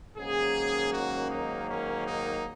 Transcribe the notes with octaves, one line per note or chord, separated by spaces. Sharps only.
G#2 D#3 F#3 A#3 C#4 G#4
F#4
D#4
C#4
D#4